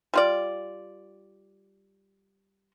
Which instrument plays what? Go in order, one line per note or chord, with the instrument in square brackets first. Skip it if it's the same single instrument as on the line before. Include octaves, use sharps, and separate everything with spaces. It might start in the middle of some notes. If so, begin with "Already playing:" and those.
[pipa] G3 F4 D5